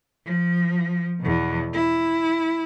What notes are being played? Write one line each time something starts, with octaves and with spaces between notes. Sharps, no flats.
F3
E2 B2
E4